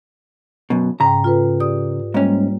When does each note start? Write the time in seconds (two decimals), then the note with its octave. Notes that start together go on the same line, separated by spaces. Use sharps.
0.70 F#2 B2
1.00 G#2 C#3 G5 A#5
1.24 F4 A4 B4
1.60 G4 D5 D#6
2.14 G#2 G3 A#3 C#4